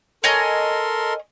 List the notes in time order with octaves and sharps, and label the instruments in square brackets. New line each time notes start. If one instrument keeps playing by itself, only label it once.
[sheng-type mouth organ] A4 A#4 C6 [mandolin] C#5 D#5 G#5